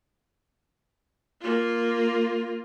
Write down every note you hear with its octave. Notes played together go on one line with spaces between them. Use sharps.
A#3 F4